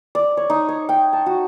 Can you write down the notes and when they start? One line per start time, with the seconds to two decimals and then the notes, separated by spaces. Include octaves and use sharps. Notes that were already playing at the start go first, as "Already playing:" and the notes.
0.15 D5
0.37 C#5
0.50 D#4
0.69 C#5
0.89 G5
1.13 A5
1.26 F#4